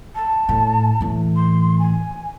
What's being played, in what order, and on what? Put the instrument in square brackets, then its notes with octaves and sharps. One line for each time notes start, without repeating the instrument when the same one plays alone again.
[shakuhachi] A5
[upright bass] A2
A2 E3
[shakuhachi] C6
G#5